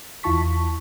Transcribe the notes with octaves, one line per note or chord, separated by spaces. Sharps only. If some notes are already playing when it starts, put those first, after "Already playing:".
E2 E4 F4 A5 C#6 B6